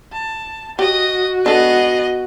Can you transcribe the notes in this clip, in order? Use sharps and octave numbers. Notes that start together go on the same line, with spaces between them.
A5
F#4 G4 D#5 D#6
B3 D4 G#4 A4 D#5